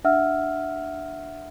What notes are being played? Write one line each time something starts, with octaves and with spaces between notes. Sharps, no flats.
D4 E5 F#5 E6 F6